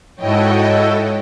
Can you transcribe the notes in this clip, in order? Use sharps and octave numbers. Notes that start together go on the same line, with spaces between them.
G#2 E4 F#4 A4 C#5 D#5 G5